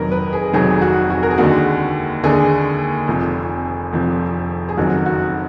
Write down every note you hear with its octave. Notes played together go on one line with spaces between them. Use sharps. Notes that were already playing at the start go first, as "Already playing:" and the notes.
Already playing: F1 F2 D#3 F#3 A#4 B4
B4
G#4
F1 F2 D#3 F#3 G#4
F#4
F#4
A#4
G#4
D#2 D3 G#3 F#4
D#2 D3 G#3 G#4
F1 F2 F3
F1 F2 F3
G#4
F#1 F2 D#3 F#3 F#4
F#4